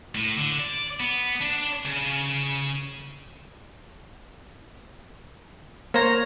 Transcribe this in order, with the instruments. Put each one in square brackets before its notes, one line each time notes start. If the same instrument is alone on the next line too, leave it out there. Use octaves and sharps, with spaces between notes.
[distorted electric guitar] A2
D3
D5
B3
D4
C#3
[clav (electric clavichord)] A#3 C5 [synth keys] C#5 A#5